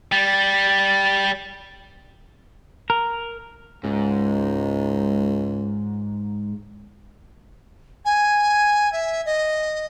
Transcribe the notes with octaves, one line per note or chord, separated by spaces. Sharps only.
G3 A6
A#4
C#2 G#2
G#5
E5
D#5